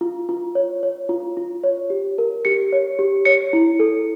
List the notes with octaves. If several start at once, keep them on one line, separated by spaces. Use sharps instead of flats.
F4
F4
C#5
C#5
F4
F4
C#5
G4
A#4
G4 C#7
C#5
G4
C#5 C#7
E4
A4